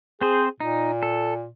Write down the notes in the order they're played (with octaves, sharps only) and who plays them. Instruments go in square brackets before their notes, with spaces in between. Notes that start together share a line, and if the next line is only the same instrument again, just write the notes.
[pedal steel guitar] C4 C5 [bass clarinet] G#4
[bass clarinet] A#2 [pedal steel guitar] D#4
[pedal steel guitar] A4